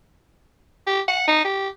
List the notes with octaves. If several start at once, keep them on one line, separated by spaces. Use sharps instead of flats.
G4
F#5
D#4
G4